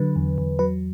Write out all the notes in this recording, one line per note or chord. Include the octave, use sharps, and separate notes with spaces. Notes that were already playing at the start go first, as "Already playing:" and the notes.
Already playing: D3 F#3 B4
E2
E2
F#3 B4